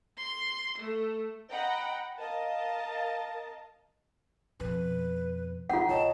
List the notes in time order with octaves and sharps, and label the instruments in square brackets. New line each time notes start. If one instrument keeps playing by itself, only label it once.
[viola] C6
A3
[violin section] D#5 F#5 G5 A#5 B5
A#4 D#5 F5 A5
[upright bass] F2 B2 [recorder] B4
[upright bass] F#3 [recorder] D#4 [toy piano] F4 F#5 [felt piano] G5
[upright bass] B1 [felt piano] C#5 D#5 [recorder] A5